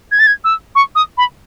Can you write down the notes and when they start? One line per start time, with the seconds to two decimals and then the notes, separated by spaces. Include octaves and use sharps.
0.12 G#6
0.19 A6
0.27 G#6
0.44 E6
0.75 C#6
0.95 D#6
1.18 B5